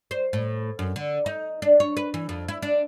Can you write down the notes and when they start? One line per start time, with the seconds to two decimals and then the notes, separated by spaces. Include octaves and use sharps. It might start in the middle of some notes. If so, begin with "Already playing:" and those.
0.11 C5
0.33 A2
0.79 F#2
0.96 D3
1.26 D#4
1.62 D4
1.80 C#5
1.97 B4
2.14 E3
2.29 F2
2.48 E4
2.62 D4